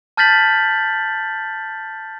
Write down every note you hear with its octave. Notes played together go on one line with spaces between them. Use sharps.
A5 F6 G6 A6 B6 F#7